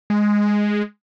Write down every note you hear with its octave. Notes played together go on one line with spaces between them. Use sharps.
G#3